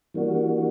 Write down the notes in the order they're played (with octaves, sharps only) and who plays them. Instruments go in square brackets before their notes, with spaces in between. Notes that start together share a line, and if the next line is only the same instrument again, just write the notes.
[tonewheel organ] E3 G3 A#3 D4 F#4